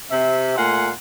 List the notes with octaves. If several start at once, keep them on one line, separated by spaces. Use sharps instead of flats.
C3 E5
A#2 A3 F5 F#5 G#5 C6